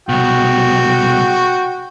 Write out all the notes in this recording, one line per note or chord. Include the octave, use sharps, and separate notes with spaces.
C2 B2 F#4 G5